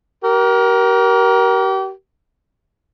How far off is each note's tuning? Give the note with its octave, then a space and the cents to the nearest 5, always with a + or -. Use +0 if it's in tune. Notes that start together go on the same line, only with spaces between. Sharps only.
G4 -35 A#4 +20